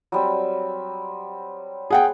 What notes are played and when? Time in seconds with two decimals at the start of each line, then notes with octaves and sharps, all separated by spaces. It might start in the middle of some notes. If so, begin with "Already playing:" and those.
0.12 F#3 G3 C4
1.90 G#4 F#5 G5